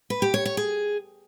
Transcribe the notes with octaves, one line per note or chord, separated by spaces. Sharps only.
B4
G4
C#5
C#5
G#4